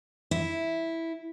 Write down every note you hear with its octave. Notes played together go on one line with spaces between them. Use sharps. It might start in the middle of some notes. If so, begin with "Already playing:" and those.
E4